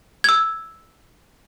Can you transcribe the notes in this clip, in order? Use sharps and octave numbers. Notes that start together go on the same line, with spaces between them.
E6 G#6